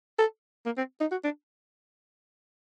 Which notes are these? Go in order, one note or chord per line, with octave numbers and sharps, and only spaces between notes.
A4
A#3
C4
D#4
F#4
D4